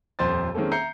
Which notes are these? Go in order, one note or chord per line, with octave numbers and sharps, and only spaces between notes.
D#1 F2 C5 C6 A6
D#3 G#3 A#3 C4 C#4 A4
E5 A#5 G6 C7 C#7